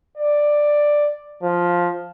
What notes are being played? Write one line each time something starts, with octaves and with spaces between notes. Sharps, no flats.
D5
F3